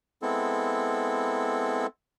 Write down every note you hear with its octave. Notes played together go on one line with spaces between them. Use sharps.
G#3 B3 C4 E4 A4